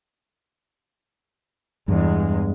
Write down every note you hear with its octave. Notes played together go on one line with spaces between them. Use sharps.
E2 G2 G#3